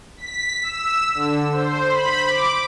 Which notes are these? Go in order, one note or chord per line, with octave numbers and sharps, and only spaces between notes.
B6
E6
D3
C5
B5
D6